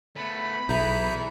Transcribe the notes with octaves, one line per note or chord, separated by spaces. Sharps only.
A3 B3 B5
B1 E3 G#4 E5 A#5 G6